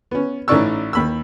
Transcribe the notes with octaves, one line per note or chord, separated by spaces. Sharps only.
B3 C#4
A1 C#4 D#4 D5 C#6 E6
D#2 B5 E6